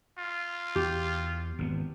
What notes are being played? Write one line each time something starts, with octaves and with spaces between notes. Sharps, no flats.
F4
E2 G4
G#1 C#3 B3